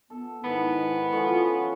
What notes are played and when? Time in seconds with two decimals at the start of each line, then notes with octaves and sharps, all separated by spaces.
0.10 B3 A4
0.44 G#2 D#3 G#3 B3 E4
1.12 F3 C#4 F#4 A4